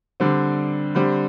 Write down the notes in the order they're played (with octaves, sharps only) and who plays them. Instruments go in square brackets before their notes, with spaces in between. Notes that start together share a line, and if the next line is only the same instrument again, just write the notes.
[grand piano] D3 G3 C4
D3 G3 C4